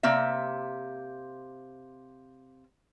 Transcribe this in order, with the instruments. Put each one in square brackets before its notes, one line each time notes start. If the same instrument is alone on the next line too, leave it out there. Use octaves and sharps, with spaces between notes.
[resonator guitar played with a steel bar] C3 A#3 C4 E5